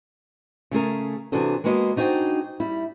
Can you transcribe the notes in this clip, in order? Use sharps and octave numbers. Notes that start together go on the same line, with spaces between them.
C#3 A3 G#4 A#4
C3 E3 D4 F#4 G#4 A4
G#3 A#3 B3 F#4 D5 D#5
D4 D#4 F#4 G#4 C5 G5
G3 E4